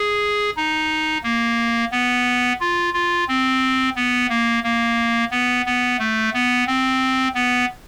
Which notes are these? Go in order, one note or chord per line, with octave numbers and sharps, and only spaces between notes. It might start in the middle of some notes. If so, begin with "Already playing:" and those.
Already playing: G#4
D#4
A#3
B3
F4
F4
C4
B3
A#3
A#3
B3
B3
A3
B3
C4
B3